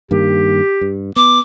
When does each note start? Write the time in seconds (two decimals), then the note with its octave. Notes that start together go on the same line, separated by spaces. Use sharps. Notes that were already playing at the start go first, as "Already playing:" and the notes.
0.11 G2 D#3 A#3 G4
0.81 G2
1.16 B3 D6